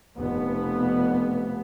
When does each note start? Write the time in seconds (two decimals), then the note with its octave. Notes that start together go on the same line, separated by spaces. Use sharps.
0.16 F1 B3